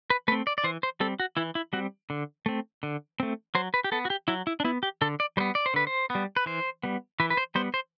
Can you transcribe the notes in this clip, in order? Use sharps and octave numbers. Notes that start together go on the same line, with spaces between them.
B4
A3 C4 B4
D5
D5
E3 C5
C5
G3 C4 A4
F#4
E3 E4
E4
G3 C4 F#4
D3
A3 C4
D3
A3 C4
F#3 C5
B4
G4
B3 A4
F#4
G4
F#3 E4
E4
D4
B3 E4
G4
D3 A4
D5
G3 B3 C5
D5
C5
D3 B4
C5
B3
G3
B4
E3 C5
G3 B3
E3 B4
B4
C5
G3 B3 C5
C5